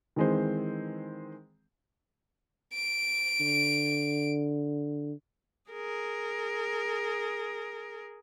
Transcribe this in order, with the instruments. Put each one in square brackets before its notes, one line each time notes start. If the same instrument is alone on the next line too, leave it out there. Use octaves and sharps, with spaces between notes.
[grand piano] D#3 E3 G#3 C4 C5
[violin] D7
[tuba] D3
[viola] G#4 A#4